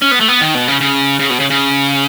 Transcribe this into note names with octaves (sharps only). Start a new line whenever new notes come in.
C#4
B3
A3
B3
D#3
B2
C#3
C#3
C#3
B2
C#3
C#3